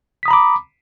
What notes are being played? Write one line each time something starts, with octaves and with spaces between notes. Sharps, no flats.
A#5 B5 D6 D#6 B6